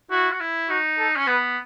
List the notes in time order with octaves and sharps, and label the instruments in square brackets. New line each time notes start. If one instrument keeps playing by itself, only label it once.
[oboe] E4 [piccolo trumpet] F#4
[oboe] F#4
E4
[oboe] D#4 [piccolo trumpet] F#4
[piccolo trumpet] A4
[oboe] C#4
[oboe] B3 [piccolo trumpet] B4